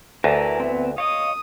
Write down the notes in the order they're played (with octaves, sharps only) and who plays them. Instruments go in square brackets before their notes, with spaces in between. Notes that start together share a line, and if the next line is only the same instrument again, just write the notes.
[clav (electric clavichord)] D2 [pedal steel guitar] A#4 G#5 A5 [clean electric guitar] B4 E5
[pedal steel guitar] B3 C4
[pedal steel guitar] C#5 D#5 [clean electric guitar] F5 [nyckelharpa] D#6